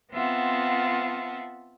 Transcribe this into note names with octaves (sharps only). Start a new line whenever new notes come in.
B3 C4 F4 E5 F#5 A5